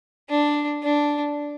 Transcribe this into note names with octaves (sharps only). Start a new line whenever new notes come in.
D4
D4